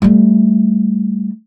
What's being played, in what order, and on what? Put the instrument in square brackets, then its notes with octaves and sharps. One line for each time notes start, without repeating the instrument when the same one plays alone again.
[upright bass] G3 A3